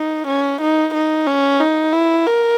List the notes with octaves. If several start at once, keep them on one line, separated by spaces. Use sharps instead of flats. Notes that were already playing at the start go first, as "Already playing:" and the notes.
Already playing: D#4
C#4
D#4
D#4
C#4
D#4
E4
A#4